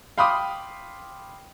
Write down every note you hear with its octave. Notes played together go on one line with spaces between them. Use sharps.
F5 G5 B5 C6 D6 D#6